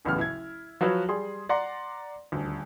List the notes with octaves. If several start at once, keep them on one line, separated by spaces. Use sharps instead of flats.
D1 A1 A2 C#3 B3 F6
E4 G#6
F3 F#3 F#4 B4 C#5
G3 G#4 C6
D5 F#5 A#5 C6
D#1 D2